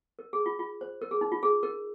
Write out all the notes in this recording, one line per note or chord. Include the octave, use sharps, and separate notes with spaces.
A#4
G#4
F4
F4
C5
A#4
G#4
D#4
F4
G#4
A#4